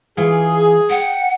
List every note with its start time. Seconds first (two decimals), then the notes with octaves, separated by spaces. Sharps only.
0.17 E3 F4 G#4 F5
0.90 F#5 G5